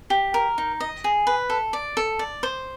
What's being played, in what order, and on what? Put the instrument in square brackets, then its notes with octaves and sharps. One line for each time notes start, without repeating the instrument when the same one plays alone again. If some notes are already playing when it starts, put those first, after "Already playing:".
[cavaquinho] G4
A#4
D#4
D#5
G#4
B4
A4
D5
A4
D5
C5